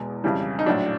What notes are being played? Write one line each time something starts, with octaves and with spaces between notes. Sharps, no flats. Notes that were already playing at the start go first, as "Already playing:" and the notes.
Already playing: E2 B2 G#3
F2 C#3 E3 G3
D#4
A#1 A2 F#3 D4